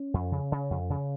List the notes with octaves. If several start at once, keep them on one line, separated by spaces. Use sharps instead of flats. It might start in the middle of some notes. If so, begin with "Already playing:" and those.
Already playing: C#4
F2
C#3
C#3
F2
C#3